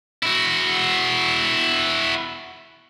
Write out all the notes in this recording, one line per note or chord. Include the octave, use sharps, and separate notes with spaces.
E4 F#4